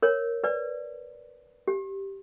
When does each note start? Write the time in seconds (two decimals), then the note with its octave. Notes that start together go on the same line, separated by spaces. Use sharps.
0.02 A#4 C#5
0.44 B4 D5
1.68 G4